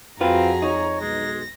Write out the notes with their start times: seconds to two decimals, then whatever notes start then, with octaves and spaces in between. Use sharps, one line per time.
0.21 F2 C4 F4 F#4 G#4 B4 A#5
0.62 D#4 C#5
1.01 B1 B2 G#3 A#6